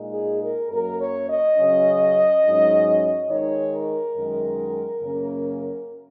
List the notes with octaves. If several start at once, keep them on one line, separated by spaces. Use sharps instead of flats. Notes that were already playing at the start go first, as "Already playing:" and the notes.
Already playing: A#2 G#3 D#4
G#4
A#4
F#2 F#3 A#3 A#4
C#5
D#5
C#3 F#3 C#4
G#2 F#3 C#4
D#3 G#3 D#4 C#5
A#4
F#2 D#3 G#3
F#2 C#3 A#3 C#4